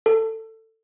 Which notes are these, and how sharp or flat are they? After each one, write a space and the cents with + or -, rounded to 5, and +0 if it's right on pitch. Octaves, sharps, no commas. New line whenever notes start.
A4 +20